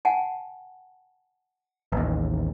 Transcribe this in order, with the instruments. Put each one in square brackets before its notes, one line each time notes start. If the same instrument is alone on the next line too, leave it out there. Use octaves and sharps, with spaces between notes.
[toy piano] F#5 G#5 A5
[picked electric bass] A1 D#2